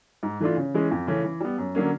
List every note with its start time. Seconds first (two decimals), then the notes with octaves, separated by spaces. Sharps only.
0.23 G#2
0.40 E3 A3 D4 F4
0.57 C#3
0.74 E3 G#3 C#4
0.91 F2
1.07 C#3 E3 A3 C#4
1.24 E3
1.41 G3 B3
1.58 F#2
1.75 D3 F#3 A#3 C#4